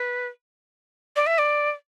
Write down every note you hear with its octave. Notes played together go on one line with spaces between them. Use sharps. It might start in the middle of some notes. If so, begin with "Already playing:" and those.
Already playing: B4
D5
E5
D5